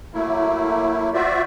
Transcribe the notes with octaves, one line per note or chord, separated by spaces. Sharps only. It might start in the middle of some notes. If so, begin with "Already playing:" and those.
F#3 A3 A#3 E4
F4 F#4 C5 D5 E5